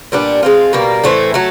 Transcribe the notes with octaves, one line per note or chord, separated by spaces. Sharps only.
A#2 G3 B3 D4
G#3 C4 F4
B2 G3 A#3
A2 E3 A3 C4
F#3 A3